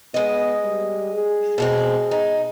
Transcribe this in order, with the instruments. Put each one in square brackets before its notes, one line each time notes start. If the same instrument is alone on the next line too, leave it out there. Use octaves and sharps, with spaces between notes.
[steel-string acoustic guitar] G#3 D#5 [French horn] B3
[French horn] G3
G#4
[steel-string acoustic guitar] B2 G#3 C4
D#4